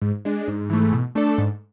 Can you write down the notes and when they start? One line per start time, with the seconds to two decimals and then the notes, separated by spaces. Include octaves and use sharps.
0.02 G#2
0.25 G#3 D4
0.48 G#2
0.70 E3 A3
0.93 B2
1.15 A3 D4 A4 D5
1.38 G#2